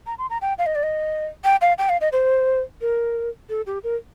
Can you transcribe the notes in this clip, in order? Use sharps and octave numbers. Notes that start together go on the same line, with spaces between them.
A#5
C6
A#5
G5
F5
D#5
D5
D#5
G5
F5
G5
F5
D#5
C5
A#4
A4
G4
A#4